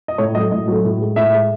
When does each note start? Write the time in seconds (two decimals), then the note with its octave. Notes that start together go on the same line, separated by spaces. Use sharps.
0.08 D#5
0.18 A2 C#5
0.35 F#3 A3 D#5
0.51 A2 D#5
0.68 F#3 A3
0.85 A2
1.01 G#3
1.16 A2 E5
1.33 G#3